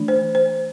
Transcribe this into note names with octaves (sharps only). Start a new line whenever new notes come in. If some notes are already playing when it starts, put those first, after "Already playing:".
Already playing: E3 A3 D4
C5
C5